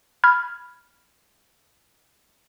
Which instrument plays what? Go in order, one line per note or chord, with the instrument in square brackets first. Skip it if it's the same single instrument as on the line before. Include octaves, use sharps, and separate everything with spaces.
[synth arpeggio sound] B5 F6 G#6